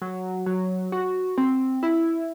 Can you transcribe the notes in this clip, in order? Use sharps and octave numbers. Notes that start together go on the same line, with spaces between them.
F#3
F#3
F#4
C4
E4